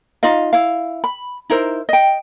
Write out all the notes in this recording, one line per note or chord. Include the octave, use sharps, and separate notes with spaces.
D#4 F4 D#5 F5
E4 F5
B5
D#4 E4 A#4 C5
D#5 G5